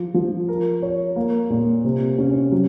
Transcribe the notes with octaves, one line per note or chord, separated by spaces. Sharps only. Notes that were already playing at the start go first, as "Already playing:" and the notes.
Already playing: F3
F3
A#4
C#5
A#3
A#2
C3
C#4
F#3